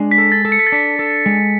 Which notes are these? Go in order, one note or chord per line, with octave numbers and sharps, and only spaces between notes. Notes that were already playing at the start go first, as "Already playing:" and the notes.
Already playing: G#3 D4
B6
A4
A6
A4
C#7
B6
A6
D4 B6
A4
G#3